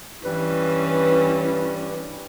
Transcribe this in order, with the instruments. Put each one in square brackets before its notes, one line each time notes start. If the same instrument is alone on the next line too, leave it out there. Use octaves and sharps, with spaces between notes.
[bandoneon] G2 G3 [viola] E3 C#4 [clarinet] B4